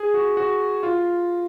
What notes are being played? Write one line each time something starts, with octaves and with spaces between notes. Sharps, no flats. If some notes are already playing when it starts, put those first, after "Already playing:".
Already playing: G#4
F#4
F#4
F4